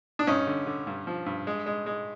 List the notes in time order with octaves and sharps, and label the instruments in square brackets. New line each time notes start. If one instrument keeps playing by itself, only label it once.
[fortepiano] D4
G2 C#4 D#4
D3
D3
G2
F3
G2
G#3
G#3
G#3